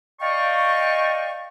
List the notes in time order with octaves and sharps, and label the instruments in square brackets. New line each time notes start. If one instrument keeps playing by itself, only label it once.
[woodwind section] D5 D#5 F5 G5 A5 C#6